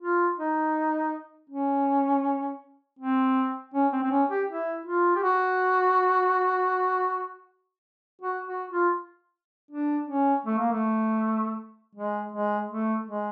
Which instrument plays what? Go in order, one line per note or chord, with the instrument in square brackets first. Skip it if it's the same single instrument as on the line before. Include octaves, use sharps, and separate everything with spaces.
[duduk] F4
D#4
C#4
C4
C#4
C4
C4
C#4
G4
E4
F4
G4
F#4
F#4
F#4
F4
D4
C#4
A3
A#3
A3
G#3
G#3
A3
G#3